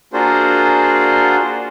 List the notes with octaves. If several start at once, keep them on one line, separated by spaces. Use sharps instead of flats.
A#3 D4 F4 F#4 G#4 C5